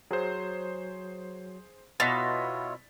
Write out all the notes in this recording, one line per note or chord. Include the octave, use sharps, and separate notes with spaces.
F#3 G#4 C5
B2 E4 F4 C#5 F#5 C6 A6 B6